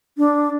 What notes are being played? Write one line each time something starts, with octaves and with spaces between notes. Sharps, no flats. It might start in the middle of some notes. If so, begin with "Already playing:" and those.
D4